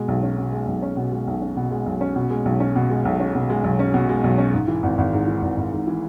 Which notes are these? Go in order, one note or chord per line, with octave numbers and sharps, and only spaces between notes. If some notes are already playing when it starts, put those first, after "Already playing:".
Already playing: B2 G#3
B1
C#4
B2
G#3
B1
C#4
B2
G#3
B1
C#4
B2
G#3
B1
C#4
B2
G#3
B1
C#4
B2
G#3
B1
C#4
B2
G#3
B1
C#4
B2
G#3
B1
C#4
G#2
E3
G#1
G#1
G#2
E3
G#1
G#1
G#2
E3